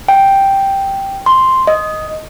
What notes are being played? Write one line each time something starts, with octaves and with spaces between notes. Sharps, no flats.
G5
C6
D#5